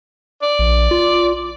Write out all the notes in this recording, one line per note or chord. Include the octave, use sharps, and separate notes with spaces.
D5
A#1
F4